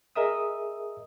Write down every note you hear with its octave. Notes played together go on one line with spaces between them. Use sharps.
G#4 A#4 D#5 E5 D#6 E6